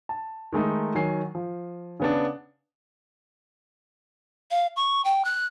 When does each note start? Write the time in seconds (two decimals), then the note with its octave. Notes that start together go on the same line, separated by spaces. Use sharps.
0.09 A5
0.53 D#3 G#3 A3 D#4
0.95 D#3 F#3 G#5 C7
1.35 F3
2.00 C#3 B3 D4
4.51 F5
4.76 C#6
5.05 G5
5.25 F#6